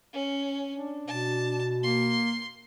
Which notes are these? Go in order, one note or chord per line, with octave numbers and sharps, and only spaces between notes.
C#4
D4
B2 A5
A#3 C6